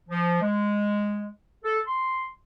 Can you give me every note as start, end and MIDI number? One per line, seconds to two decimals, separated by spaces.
0.09 0.38 53
0.41 1.27 56
1.64 1.79 69
1.86 2.29 84